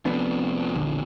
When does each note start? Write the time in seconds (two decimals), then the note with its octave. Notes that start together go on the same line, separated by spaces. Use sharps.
0.05 F1 F2 B3 D4
0.75 E1 A#1 D3